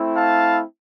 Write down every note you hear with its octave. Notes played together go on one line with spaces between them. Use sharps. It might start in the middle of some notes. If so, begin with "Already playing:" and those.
Already playing: A3 C4 E4
F5 A5